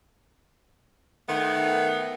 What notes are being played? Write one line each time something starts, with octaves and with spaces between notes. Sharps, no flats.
D#3 A3 B3